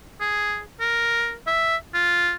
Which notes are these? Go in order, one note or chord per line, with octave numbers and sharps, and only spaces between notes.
G#4
A#4
E5
F4